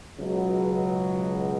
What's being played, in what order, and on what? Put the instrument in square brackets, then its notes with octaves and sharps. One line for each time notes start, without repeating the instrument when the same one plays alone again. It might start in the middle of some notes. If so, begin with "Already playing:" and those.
[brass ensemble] C#2 B2 F#3